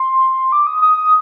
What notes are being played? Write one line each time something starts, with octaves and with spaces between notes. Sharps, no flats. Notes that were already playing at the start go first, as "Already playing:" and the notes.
Already playing: C6
D6
D#6
D#6
D#6